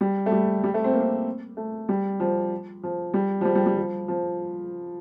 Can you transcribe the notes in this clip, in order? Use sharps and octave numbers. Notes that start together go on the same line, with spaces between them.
G3
A3
G3
G3
A3
C4
A#3
C4
A3
G3
F3
F3
G3
F3
G3
G3
G3
F3
F3